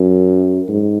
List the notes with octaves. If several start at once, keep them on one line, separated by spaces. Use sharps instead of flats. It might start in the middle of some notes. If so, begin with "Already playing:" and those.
Already playing: F#2
G#2